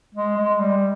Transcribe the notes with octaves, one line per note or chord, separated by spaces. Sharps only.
G#3
G#3
G3